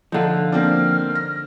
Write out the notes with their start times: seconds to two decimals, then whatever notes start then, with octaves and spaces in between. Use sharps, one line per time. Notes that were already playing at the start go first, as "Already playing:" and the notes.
0.12 D3 F3 D#4 F4
0.52 A#3 C4 D4 F6
1.15 A#6